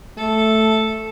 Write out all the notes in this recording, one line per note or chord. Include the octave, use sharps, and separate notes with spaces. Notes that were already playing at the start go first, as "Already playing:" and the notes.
A3 A4